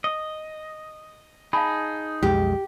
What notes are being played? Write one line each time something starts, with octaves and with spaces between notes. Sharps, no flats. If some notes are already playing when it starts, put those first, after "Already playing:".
D#5
D#4 G#4 F5 A5 B5
B1 F2 G#3 G4